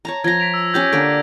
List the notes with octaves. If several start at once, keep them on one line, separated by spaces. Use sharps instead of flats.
C#5 A5 A#5
F3 A#5 G#6 A#6
B6 D7 F7
E6
C#4 G4 D6 G6
D3 A#3 D4 D7